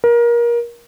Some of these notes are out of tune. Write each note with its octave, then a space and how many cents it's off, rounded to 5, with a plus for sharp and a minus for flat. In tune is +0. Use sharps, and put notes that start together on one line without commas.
A#4 +25